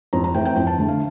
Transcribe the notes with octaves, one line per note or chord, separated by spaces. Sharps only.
F2 A#5
A#5
E3 A3 C4 G5
G5
F2 G5
A5
D3 A3
F5